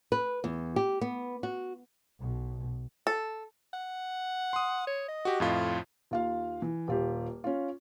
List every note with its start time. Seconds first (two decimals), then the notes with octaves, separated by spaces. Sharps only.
0.12 B4
0.44 E2
0.76 G4
1.01 B3
1.43 F#4
2.20 B1 B2
3.07 A4
3.73 F#5
4.53 C6 D#6
4.87 C#5
5.08 D#5
5.25 F#4 G4
5.40 F2 A2 F4
6.11 D#2 F4 F5
6.62 E3
6.88 D#1 F4 G4
7.44 C#4 F4